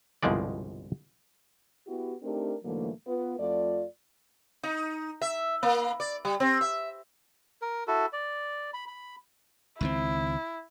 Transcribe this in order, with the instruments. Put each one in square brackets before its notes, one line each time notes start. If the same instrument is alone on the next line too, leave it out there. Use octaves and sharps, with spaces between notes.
[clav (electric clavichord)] G1 C2 B2 F3 G#3 D5
[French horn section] B3 E4 F#4 G4
A3 C4 D4 D#4 G4 A#4
G#2 D3 E3 F#3 A3 A#3
B3 F4 B4
F2 A3 F4 D5
[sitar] D#4
E5
A#3
D5
G3
C4
E5
[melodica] A#4
E4 F#4 A4
D5
B5
B5
[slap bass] C#2 D#3 C4 [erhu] E4